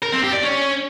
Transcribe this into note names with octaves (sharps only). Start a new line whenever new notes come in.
A#4
C4
G4
D5
C#4